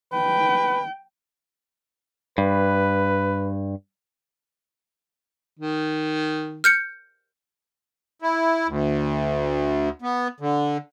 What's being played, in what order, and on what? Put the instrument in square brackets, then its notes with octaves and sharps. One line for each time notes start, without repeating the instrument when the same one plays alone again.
[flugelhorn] B4 [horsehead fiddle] G5
[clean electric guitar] G2 [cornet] B4
[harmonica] D#3
[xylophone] F6 G6 C#7
[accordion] E4
D2
B3
D3